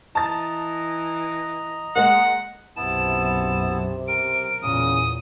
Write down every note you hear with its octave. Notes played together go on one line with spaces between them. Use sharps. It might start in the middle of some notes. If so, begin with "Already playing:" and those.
E3 D#5 A5 A#5 A6
G#3 A#3 F#5
B1 F#2 C3 B3 E4 A5 E7
A#4 D7
E2 A#2 C#3 D#6